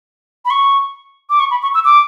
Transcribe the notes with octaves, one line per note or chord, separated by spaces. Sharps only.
B5
C#6
D6
C#6
B5
C#6
E6
D6